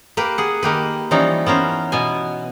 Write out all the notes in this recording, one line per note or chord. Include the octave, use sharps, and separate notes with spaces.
A#3 G4 B4
G#4 F#5
D#3 A#3 G4 B4
E3 F3 G3 C#4 D#4
B3 C#4 A#4 C5
B2 B3 G#5